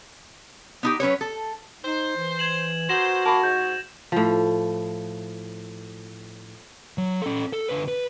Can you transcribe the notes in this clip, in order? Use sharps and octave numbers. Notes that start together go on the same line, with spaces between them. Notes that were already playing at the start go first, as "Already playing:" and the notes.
B3 D#4 G4
F#3 C#4 B4 C#5
A4
D#4 C5
E3
G#6 E7 F#7
B3 F#4 A#4 C5 A#6 E7 F#7
F#2 A#3 A5 B5 C#6
G#2 G6
A2 F3
F#3
C#4 A4
A4
D3 B4
B4